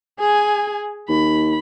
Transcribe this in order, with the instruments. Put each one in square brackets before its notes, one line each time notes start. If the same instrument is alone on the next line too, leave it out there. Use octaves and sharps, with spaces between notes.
[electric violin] G#4 G#5
[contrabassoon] D#2 [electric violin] B5